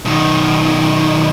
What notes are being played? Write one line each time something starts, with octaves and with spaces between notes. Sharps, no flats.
B1 D#3